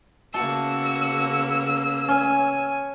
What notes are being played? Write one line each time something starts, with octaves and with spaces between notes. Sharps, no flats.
C#3 A#3 B3 F#4 A5 E6
C#4 G#5